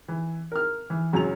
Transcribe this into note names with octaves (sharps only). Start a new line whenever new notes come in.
E3
A#4 F6
E3
C#2 F#2 F#3 G#5 F7